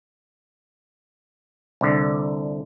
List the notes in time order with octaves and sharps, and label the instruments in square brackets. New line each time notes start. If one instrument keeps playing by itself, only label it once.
[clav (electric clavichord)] C2 D3